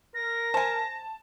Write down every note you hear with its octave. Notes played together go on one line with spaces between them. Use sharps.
A#4 A#6
C5 G#5 A5